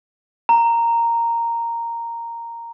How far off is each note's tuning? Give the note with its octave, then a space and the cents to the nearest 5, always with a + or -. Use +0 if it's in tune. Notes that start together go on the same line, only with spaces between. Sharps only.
A#5 -5